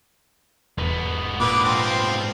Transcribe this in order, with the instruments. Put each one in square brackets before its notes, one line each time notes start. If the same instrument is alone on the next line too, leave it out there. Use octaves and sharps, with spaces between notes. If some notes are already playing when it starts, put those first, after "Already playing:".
[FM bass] E1 [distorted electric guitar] G#2 B3
[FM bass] A#2 [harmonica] D3 B4 D6
[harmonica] F3 C4